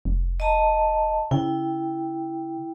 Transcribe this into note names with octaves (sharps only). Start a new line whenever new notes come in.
F1
D#5 A5 A#5
C#3 E4 G5